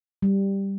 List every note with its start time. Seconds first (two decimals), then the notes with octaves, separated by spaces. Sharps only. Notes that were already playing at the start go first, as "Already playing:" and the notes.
0.22 G3